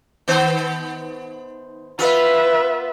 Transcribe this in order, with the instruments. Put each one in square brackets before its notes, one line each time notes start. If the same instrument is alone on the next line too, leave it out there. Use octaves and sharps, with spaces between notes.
[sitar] D#3 B3 C5
[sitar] B3 F4 [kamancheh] B4 E5